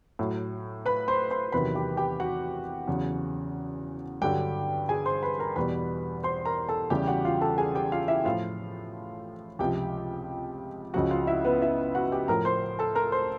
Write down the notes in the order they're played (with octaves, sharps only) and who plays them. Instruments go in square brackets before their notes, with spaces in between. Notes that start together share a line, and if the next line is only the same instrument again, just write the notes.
[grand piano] A2 F#3
B4 B5
C5 C6
C5 C6
E2 C3 D#3 F#3 B4 B5
G4 G5
G4 G5
F#4 F#5
E2 C#3 F#3
G2 D3 F#3 G4 G5
G#4 G#5
C5 C6
B4 B5
A#4 A#5
E2 B2 G3 B4 B5
C5 C6
A#4 A#5
A4 A5
E2 C#3 E3 G3 G4 G5
F#4 F#5
F4 F5
A4 A5
G#4 G#5
G4 G5
F4 F5
E4 E5
A2 F3 F4 F5
C#2 C3 F3 G4 G5
C#2 C#3 F3 F#4 F#5
F4 F5
E4 E5
B3 B4
E4 E5
F#4 F#5
G4 G5
A2 F3 A#4 A#5
C5 C6
A4 A5
A#4 A#5
C5 C6